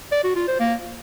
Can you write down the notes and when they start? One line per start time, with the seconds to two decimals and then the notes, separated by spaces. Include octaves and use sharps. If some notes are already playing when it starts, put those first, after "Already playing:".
0.12 D5
0.24 F#4
0.36 F4
0.48 C5
0.60 A#3